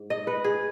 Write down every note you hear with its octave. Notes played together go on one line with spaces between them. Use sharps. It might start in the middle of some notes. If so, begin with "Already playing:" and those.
Already playing: G#2
D#5
B4
G#4